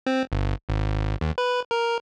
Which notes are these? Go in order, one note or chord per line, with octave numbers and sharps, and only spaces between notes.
C4
G1
G#1
D#2
B4
A#4